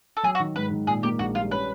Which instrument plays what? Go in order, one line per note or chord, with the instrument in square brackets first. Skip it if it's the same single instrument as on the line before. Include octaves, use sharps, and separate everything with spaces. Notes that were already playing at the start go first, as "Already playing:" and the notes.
[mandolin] A4
[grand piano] F#3 [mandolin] G#4
[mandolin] F#4
[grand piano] D#3
[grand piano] G#2 [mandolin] B4
[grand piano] D#3
[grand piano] A#2 [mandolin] G#4
[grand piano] A#3 [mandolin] G4
[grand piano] A#1 [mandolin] F#4
[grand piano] G3 [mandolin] F4
[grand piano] C#4 [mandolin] B4